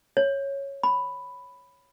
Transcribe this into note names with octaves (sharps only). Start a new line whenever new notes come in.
C#5
B5